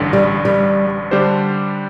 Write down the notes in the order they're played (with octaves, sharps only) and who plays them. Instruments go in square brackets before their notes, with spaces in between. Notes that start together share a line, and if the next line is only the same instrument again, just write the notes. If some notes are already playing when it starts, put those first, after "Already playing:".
Already playing: [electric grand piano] A1 G2 D3
[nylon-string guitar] G3
G3
[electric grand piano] D3 G3 D4 G4 C5